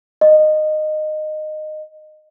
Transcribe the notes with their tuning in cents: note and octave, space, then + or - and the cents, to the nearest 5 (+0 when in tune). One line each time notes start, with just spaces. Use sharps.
D#5 -15